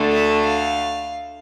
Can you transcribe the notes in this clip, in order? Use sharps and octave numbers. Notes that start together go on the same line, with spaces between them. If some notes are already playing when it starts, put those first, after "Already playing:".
Already playing: D2 D3 A3
E5
F5